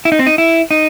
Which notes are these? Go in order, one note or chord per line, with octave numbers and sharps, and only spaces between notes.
E4
D#4
C4
D#4
E4
D#4